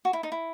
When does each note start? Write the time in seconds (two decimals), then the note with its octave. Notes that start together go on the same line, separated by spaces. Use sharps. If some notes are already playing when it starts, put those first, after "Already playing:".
0.05 F#4
0.13 E4
0.23 D#4
0.32 E4